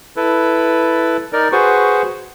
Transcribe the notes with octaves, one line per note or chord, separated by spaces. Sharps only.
E4 A4 B4
D#4 A#4 D5
F#4 G#4 B4 C5 C#6